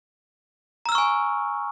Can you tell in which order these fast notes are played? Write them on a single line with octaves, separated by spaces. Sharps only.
A#5 E6 F6 C#6 G#5